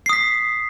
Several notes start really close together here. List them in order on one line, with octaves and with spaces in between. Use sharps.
C7 D#6 B6